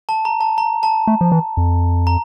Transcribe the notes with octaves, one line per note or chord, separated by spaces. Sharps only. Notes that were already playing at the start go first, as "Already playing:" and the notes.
A5
A#5
A5
A#5
A5
A3
F3
E3
F2
A#5